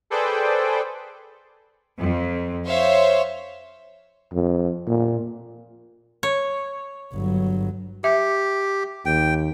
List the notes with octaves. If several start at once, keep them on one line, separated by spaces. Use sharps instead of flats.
G#4 A4 B4 C5 D5 G5
F2
C5 C#5 E5 F5
F2
A#2
C#5
G1 F#3
G4 E5
D#2 G5